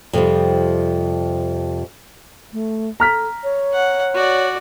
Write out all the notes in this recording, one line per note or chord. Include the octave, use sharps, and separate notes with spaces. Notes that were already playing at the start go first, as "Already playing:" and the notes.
F2 C3 F3 G3
A3
A4 A#5 F6 B6
C#5
F#5
F#4 D5